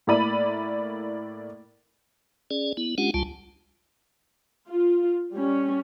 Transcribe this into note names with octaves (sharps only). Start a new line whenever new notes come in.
A2 A#3 E4 D5 B5 D#7
C#4 G#4 D5
B3 E4
G#3 C#4 D4 F4 G4 F#5
C#2 G3 F4 A5
F4
G3 C#4